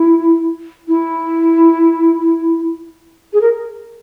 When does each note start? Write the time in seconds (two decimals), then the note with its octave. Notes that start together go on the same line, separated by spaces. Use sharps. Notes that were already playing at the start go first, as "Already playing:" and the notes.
Already playing: E4
0.88 E4
3.33 G#4
3.41 A#4